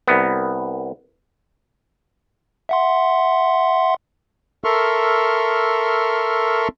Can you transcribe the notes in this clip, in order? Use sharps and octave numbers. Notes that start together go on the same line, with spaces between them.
C2 B3
E5 F#5 C6
A4 A#4 E5 C6 C#6 F6